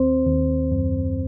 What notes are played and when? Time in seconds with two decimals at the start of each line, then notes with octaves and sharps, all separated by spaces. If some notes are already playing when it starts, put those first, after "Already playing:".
Already playing: D#2 C4 C5
0.26 D#2
0.71 F#2